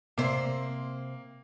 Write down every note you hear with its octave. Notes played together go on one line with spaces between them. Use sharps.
C3 A#3 C5